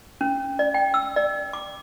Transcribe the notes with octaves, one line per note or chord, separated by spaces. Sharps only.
C#4
D5
G5
E6
D5
D6